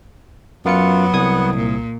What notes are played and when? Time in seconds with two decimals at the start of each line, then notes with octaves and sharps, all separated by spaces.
0.65 F#2 F#3 B3 F4 C#7
1.13 C2 D#6 G#6
1.57 A#2